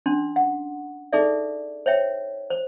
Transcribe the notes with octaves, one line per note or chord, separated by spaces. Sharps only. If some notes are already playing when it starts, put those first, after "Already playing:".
C#4 D4 C6
F#5
D#4 G#4 A4 D5 E5
C5 C#5 E5 G5
C5